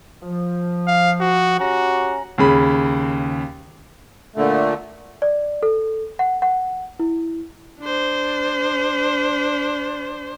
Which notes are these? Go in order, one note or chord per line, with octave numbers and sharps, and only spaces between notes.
F3
F5
F#4
C#4 F#4 G4 A#5
D#2 C#3 B5
A#2 D3 A3
D5
A4
F#5
F#5
E4
D4 C5